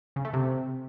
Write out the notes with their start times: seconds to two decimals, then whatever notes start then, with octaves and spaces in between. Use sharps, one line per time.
0.16 C#3
0.25 A3
0.33 C3